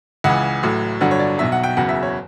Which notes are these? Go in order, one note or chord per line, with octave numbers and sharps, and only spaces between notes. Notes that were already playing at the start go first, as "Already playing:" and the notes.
C#2 C#3 E3 F#5
A1 A2 F#3
G1 G2 D3 F#3 F#5
C#5
D5
B1 B2 F#3 E5
F#5
G5
F#1 E2 C#3 F#3 F#5
E5
C#5